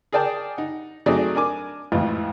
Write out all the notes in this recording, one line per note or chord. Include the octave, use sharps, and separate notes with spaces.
G#4 A#4 D5 G5 A5
D#4 F#5
F#3 A3 C4 D#4 G#4 D5
D4 A#4 G#5 D6
G#1 F2 A2 E3 F4